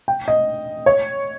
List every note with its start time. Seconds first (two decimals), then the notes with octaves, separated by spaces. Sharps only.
0.08 G5
0.28 D#5
0.86 C#5